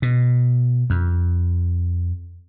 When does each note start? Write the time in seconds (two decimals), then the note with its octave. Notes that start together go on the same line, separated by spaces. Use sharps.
0.02 B2
0.90 F2